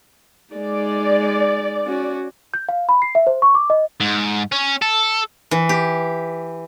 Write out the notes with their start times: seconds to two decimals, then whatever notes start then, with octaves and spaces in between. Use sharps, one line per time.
0.54 G#3 D#4 D5
1.86 C#4 F#4
2.54 G6
2.69 F5
2.89 B5
3.02 C7
3.15 E5
3.27 C5
3.42 C#6
3.55 D6
3.70 D#5
4.00 G#2
4.52 C#4
4.82 A4
5.51 E3
5.69 G4